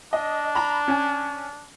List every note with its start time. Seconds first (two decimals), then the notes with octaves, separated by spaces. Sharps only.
0.13 D4 D#5
0.55 A#5 B5
0.88 C#4 G#5